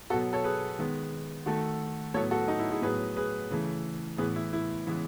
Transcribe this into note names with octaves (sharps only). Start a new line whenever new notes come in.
B2 F#3 B3 F#4 A4
A4 C#5
G#4 B4
D#3 G#3 B3
D#3 A3 F#4 A4
A2 F#3 B3 A4 C#5
F#4 A4
D#4 F#4
E4
E4 G#4
A2 F#3 B3 G#4 B4
G#4 B4
C#3 E3 A3
A2 E3 B3 G#4 B4
E4
E4
C#3 E3 G#3 B3